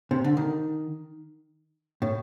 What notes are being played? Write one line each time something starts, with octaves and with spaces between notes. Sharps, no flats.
C3
D3
D#3
A2